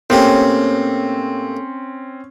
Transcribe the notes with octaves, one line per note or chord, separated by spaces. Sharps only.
A2 A#3 C4 C#4 G4